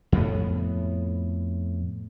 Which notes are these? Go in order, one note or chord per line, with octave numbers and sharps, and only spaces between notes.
F2 A2 B3